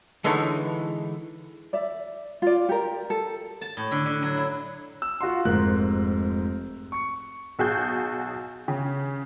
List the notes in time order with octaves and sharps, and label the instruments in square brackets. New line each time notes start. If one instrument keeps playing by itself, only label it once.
[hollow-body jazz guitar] D3 E3 G#3 D#4 A4 C#5
[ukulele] D5 E5
F4 D5
G4 A#4
A4
[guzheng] A5
A2
D3
D3
F#3
E4
[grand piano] E6
F4 F#4 F#5 C6
F1 G#2 A#4 F#6
C#6 C#7
[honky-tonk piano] B1 F#4 G#4 G6
C#3